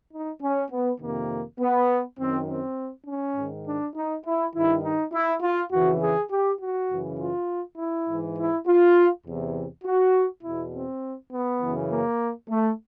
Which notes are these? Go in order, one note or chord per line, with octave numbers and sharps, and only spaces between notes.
D#4
C#4
B3
F2 C3 D#3 A#3
B3
F#2 D#3 C4
C4
C#4
G#2 D#3
D4
D#4
E4
G2 D#3 E4
D#4
E4
F4
F2 C#3 E3 F#4
G#4
G4
F#4
F#2 C#3 E3
F4
E4
G#2 E3
E4
F4
E2 C3 E3
F#4
E2 B2 E4
C4
B3
F#2 C#3 E3
A#3
A3